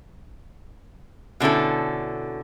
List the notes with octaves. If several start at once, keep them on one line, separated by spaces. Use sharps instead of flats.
B2 D3 C#4 E4 A4